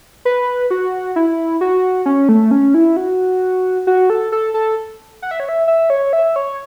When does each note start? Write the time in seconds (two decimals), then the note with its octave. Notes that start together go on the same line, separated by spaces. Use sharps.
0.25 B4
0.71 F#4
1.16 E4
1.61 F#4
2.06 C#4
2.29 A3
2.51 C#4
2.74 E4
2.97 F#4
3.87 F#4
4.10 A4
4.32 A4
4.54 A4
5.22 F#5
5.31 E5
5.40 C#5
5.49 E5
5.67 E5
5.90 C#5
6.13 E5
6.36 C#5